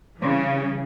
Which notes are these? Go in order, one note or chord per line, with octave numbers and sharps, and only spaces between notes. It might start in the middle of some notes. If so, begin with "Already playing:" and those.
C#3 E3 G3